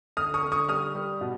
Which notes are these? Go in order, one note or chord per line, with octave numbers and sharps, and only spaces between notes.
D3 D#6 F6
C#6 D#6
D3
C#6 D#6
G3 D#6 F6
G3
B2